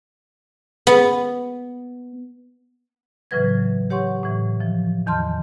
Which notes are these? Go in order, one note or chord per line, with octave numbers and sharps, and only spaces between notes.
B3
A2 C#3 E3 F#3 B4 G#6
G4 C#5 F#5 C6 C#6
A2 E3
E3 F3
E2 D#3 A5 C6 F6